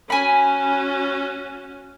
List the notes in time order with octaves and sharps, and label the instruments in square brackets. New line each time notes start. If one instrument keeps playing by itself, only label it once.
[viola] C#4 F#4 [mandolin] G#5 B5